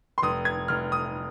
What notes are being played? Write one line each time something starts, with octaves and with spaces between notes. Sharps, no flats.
C6
F1 D#6
G#6
F1 F6
D#6